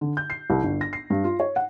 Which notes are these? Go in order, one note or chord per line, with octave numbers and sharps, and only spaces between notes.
D3
G6
C7
C2
G1
A#6
C7
G2
F4
C#5
F#5